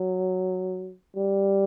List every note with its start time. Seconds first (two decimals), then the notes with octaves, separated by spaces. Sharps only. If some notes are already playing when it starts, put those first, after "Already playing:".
Already playing: F#3
1.16 G3